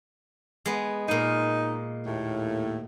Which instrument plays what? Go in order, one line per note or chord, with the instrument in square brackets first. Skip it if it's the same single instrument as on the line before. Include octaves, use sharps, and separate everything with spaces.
[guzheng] G#3 B3
[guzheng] A#2 G#3 [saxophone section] D#4
[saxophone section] D#2 A2